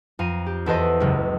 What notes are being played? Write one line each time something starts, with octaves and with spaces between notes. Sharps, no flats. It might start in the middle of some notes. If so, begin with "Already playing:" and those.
F2 F4 F5 A#5 D#7
G4
E2 E4 A4 B4 C5 D#5
F#1 C#2